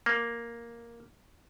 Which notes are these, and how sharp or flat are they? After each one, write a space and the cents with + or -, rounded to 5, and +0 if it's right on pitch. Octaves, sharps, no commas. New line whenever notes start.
A#3 +0